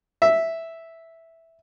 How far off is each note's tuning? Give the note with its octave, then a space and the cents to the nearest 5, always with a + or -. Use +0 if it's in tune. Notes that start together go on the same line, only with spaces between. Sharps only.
E5 -5